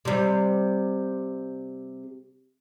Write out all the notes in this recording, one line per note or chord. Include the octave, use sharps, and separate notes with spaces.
C3 G3